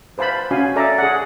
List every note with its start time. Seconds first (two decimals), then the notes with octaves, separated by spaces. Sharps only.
0.18 B4 C5 F5 A5 B5
0.51 C#4 F#4 F5 G#5
0.76 A4 D5 E5 A#5
0.98 G#4 F#5